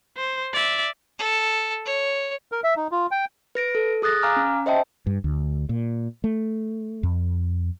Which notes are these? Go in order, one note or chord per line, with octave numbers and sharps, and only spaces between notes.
C5
D5 E5
A4
C#5
A#4
E5
D#4
F4
G5
B4 A#6 D7
A4
G#4 D#6 F#6 A6 A#6
F5 G#5 A#5 D6 F6
C#4
C5 D#5 E5 G5 A5
G2
D2
A#2
A3
F2